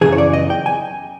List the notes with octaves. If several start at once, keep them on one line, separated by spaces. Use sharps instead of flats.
F#2 C#3 E3 G#4
C#5
D5
D#5
G5
G#5